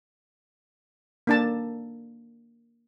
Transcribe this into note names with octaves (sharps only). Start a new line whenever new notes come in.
A#3 D4 A5